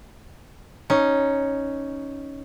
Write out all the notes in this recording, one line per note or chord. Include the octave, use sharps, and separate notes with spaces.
C#4 D#4